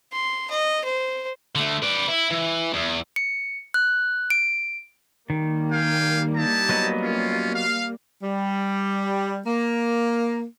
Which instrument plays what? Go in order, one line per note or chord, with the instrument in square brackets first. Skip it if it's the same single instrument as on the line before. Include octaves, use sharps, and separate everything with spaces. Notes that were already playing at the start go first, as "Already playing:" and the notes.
[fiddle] C6
D#5
C5
[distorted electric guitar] D3 A3
B4 D5
E4
E3
E2
[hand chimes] C#7
F#6
D7
[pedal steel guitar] D#3 [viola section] G3 A#3
[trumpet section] F5 G5 G#5
D#4 E4 A5
[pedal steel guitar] F#3 B3 D#5
[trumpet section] C#4 F4
F5
[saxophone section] G3
A#3